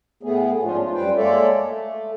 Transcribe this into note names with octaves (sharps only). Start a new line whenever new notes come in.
A2 A3 B3 G#4
G#2 F3 C#4 D4 F4
F4
F#2 G3 B4 C5 G5
G#3 A#3 A4 C#5 D5 E5
A3